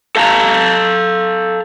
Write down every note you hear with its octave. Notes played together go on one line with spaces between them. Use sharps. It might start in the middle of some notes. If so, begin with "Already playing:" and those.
A4 F5 A5 A#5